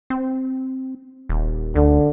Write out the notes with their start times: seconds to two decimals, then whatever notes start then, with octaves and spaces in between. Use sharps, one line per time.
0.10 C4
1.29 D#1
1.76 D2 D3